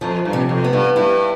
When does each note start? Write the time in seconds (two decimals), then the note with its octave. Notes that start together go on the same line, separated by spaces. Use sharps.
0.01 F2 F3
0.25 G2
0.33 C3
0.49 F2
0.64 B3
0.73 G2
0.96 G2 E4